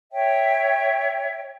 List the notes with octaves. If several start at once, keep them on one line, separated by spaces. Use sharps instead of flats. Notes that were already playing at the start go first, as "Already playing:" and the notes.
C#5 E5 G5